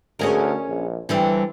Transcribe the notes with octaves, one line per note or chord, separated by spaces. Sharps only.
D2 C#4 G#4 A#4
A#1
D3 E3 G3 C4